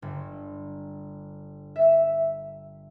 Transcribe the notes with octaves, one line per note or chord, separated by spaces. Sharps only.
G1
E5